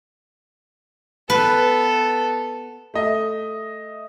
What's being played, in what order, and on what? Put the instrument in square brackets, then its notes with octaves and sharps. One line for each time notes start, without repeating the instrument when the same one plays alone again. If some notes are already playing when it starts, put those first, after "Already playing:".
[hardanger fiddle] B3 A4 [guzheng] B4
[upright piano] A3 D#5 E5